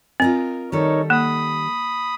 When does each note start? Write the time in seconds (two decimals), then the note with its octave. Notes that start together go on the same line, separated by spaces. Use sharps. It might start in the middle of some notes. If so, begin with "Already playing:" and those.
0.20 C4 F4 A#4 D#5
0.72 D#3 G3 D#4 A4 A#4 C#5
1.10 A#3 B5 D#6